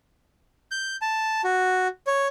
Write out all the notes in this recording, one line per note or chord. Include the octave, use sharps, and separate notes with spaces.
G6
A5
F#4
C#5